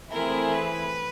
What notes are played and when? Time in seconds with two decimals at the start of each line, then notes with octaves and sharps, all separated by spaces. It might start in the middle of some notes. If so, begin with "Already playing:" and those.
0.12 E3 A3 C4 E4 G#4 A#4
0.54 B4